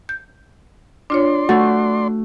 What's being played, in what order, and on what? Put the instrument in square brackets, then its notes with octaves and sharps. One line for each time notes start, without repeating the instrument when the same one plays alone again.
[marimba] G6
[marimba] D4 F4 C#5 [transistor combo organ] D5 C6
[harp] A3 [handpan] F#4 [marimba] A6